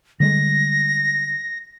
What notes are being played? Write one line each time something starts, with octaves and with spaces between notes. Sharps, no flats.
D3 G3 G#3 A#6